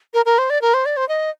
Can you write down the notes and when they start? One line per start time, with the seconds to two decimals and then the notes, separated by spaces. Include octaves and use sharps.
0.14 A#4
0.26 A#4
0.38 C5
0.50 D5
0.62 A#4
0.74 C5
0.86 D5
0.97 C5
1.09 D#5